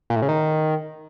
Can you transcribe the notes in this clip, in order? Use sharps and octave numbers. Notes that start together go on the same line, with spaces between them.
A#2
A2
C#3
D#3